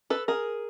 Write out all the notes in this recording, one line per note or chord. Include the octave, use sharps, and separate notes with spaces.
A4 B4
G#4 A#4